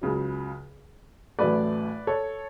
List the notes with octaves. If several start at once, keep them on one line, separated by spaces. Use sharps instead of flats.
C#2 C#3 F#3
A1 A2 F#3 A3 B4 D5
A4 C#5